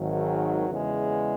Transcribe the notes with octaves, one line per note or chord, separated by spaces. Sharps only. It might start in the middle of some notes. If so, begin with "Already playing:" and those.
Already playing: G#1 G#2 D#3 F#3
E2 C#3 G#3